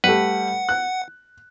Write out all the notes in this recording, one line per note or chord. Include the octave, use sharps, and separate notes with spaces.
G3 A3 B4 F#5
F#6